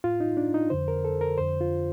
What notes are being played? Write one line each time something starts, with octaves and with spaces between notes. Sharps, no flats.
A2 F4
D#4
D4
D#4
F2 D3 C5
A#4
A4
A#4
F2 D3 C5
F4